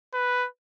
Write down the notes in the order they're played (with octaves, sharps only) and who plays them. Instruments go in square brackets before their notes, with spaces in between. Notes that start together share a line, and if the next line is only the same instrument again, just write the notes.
[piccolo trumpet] B4